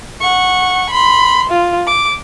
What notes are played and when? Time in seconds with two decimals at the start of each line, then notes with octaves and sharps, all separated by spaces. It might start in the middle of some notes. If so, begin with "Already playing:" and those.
0.21 F#5 C#6
0.90 B5 C6
1.50 F4
1.87 D6